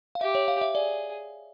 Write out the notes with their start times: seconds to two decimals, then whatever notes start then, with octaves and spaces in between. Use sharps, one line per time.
0.15 F5
0.21 G4 E5
0.35 C#5
0.48 F5
0.61 E5
0.75 G#4 D5